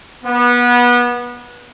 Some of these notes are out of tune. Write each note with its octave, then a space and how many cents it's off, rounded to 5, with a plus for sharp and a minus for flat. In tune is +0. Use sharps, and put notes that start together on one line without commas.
B3 -25